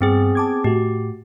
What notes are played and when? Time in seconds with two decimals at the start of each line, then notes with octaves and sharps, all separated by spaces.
0.01 G2 B3 C4 G#4
0.35 A5 D6 G#6
0.64 A2 F#4 G4